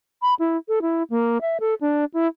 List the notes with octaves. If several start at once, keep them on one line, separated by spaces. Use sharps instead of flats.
B5
E4
A4
E4
A#3
E5
A4
D4
E4